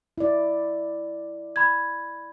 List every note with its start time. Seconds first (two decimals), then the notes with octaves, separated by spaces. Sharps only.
0.18 E4 D5
1.56 B5 G#6